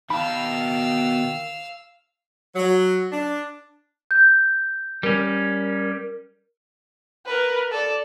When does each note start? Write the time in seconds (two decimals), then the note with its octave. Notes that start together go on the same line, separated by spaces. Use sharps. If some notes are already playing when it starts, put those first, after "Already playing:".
0.10 B2 D#3 F5 A5 B5 E6
2.55 F#3
3.12 D4
4.11 G6
5.03 G3 C#4 A#4
7.26 A#4 B4
7.71 A4 D5